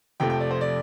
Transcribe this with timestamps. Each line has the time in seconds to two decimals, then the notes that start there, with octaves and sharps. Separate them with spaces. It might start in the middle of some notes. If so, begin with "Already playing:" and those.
0.20 F2 C3 F3 A3 G5
0.30 G5
0.40 D5
0.51 C5
0.61 D5